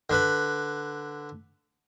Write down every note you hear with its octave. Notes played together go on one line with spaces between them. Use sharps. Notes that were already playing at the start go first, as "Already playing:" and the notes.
D3 B4